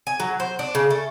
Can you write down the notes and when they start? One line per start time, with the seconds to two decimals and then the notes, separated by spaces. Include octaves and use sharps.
0.07 G#5
0.20 F#3
0.40 C5
0.59 D4
0.75 C#3
0.90 A3